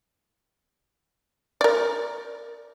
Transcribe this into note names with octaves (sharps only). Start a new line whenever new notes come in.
A#4 D5